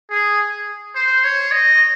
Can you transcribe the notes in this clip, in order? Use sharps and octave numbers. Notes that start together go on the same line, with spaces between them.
G#4
C5
C#5
D#5